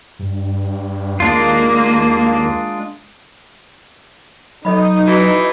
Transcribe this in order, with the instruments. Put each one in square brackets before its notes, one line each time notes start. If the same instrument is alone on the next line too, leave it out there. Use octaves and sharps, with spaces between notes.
[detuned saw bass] G2
[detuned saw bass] D#2 [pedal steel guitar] G#3 D4 F4 [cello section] A#3
[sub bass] F#3 [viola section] D#4 [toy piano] A4 D#5 B5
[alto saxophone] E3 [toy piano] F#4